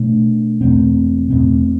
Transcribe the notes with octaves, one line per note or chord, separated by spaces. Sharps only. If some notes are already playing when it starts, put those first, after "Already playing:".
Already playing: B2 A3 D4
E2 B2 A3 C4
E2 B2 A3 C4